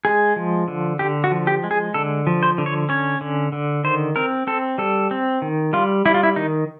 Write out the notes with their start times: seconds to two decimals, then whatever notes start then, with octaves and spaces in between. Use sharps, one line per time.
0.05 G#3 G#4
0.36 F3
0.68 D3
0.99 D3 G4
1.24 F#4
1.31 F3
1.47 G4
1.64 G#3
1.71 G#4
1.94 D3 A4
2.27 F3
2.43 C5
2.58 D3
2.66 C#5
2.89 C#4 C#5
3.21 D3
3.52 D3
3.84 D#3 C5
4.16 C4 A#4
4.47 C4 A4
4.78 G3 A4
5.11 C4
5.42 D#3
5.73 G3 F4
6.05 G3 E4
6.14 F4
6.23 E4
6.36 D#3 D#4